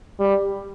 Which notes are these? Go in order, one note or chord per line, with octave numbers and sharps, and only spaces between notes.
G3